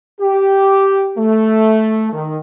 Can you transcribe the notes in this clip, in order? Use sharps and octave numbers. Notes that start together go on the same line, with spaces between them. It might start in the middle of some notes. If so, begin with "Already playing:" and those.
G4
A3
D#3